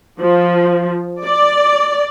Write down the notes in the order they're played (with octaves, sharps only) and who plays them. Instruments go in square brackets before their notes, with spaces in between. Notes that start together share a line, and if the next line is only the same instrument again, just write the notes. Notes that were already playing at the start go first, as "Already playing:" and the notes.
[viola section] F3
D5